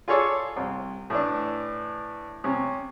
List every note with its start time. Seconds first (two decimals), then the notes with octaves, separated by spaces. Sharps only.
0.08 F4 G#4 A4 C#5 D5
0.56 C2
1.10 A2 E3 D4
2.44 C3 C#4